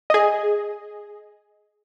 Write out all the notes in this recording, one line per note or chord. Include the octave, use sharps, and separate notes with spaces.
G#4 D#5